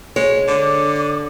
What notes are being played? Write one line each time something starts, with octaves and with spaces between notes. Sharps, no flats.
G#3 C#5
D3 D6